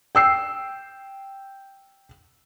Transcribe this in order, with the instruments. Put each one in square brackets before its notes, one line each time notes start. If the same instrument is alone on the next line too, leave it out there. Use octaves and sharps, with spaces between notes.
[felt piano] G5 E6 C7